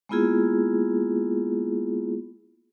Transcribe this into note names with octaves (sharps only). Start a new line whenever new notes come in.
G#3 A#3 B3 E4 F4 G#4